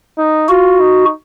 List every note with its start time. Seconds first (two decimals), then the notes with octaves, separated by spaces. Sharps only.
0.18 D#4
0.49 F4 F#4
0.80 D#4